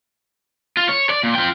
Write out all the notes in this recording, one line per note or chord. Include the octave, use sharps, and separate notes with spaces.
F4
C#5
D5
A#2
F4 G5